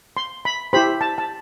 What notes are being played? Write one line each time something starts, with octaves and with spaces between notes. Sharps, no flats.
C6
B5
E4 G4 C5 B5
A5
A5